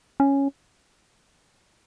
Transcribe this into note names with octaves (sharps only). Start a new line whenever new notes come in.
C#4